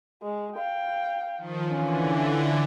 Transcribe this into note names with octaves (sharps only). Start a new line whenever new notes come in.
G#3
F5 G5
D#3 F3
D3 E3 C#4 F4